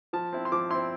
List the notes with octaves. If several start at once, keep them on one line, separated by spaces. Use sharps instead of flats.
F3 A5
C4 E4
C6
F3 D6
C4 E4 C6